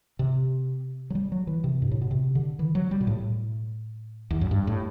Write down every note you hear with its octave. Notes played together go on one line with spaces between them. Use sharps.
C3
F#3
G3
F#3
E3
C3
G2
A2
B2
C3
D3
E3
F#3
G3
B2
A2
E2
F#2
G2
A2